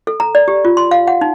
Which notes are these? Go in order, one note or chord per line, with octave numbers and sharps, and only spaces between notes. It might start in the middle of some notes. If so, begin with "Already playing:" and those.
A4
A#5
D5
G4
F4
C6
F5
F#5
D#4